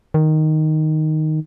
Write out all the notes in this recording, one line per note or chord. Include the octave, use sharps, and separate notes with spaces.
D#3